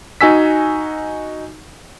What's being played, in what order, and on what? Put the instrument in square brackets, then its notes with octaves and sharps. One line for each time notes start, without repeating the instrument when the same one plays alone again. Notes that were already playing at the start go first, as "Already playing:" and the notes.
[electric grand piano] D#4 F#4 G#5 E6 B6